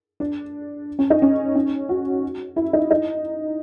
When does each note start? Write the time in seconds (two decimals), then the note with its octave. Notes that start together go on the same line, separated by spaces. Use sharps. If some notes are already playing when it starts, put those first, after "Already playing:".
0.20 D4
0.99 C#4
1.10 D#4
1.22 C#4
1.55 C#4
1.89 F#4
2.56 E4
2.73 D#4
2.91 D#4